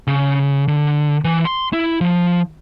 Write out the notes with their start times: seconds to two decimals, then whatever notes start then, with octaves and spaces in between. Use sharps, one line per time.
0.07 C#3
0.68 D3
1.24 E3
1.45 C6
1.73 E4
2.01 F3